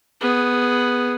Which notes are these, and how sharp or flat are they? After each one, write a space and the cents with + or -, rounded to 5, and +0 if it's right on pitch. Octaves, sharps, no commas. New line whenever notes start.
B3 +0 G#4 +0